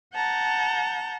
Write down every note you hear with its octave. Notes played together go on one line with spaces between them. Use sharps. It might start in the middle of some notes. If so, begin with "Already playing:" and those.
F#5 A5 A#5 G6